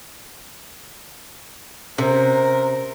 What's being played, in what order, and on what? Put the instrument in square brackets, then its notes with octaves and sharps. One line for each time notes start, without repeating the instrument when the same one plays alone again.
[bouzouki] C3 [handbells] C#4 C5 [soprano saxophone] A#4